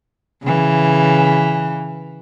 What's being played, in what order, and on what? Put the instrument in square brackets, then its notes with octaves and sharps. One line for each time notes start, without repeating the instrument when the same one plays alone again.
[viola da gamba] C#3 E3